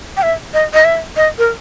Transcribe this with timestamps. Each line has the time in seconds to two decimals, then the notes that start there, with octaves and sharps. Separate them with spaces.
0.17 G5
0.23 E5
0.54 D#5
0.74 D#5
0.84 E5
1.16 D#5
1.38 A#4